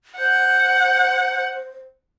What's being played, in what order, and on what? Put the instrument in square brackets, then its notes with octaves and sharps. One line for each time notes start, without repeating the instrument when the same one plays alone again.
[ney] C5 [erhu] F#5 [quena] G6